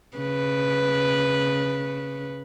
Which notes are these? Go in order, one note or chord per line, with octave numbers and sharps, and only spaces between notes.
C#3 B4